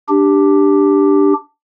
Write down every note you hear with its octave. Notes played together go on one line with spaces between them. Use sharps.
D4 G4